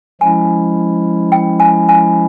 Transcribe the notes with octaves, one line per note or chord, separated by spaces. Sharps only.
F3 G#3 C#4 E4 G#5
G5
G#5
G#5